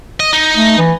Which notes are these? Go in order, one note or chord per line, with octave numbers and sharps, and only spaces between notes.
D#5
D#4
A3
E3